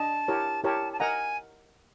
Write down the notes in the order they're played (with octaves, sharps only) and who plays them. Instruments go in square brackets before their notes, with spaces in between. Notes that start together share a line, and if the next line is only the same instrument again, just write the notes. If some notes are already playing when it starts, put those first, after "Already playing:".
Already playing: [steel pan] D4 D#5 [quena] A5
[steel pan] E4 G4 A#4 C#5
[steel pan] E4 G4 A#4 C#5 [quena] A5
[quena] A5
[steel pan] A#4 D#5 F#5 A#5 [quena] G#5